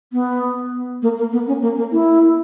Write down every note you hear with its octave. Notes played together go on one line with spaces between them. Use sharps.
B3
A#3
A#3
B3
C#4
A#3
A#3
E4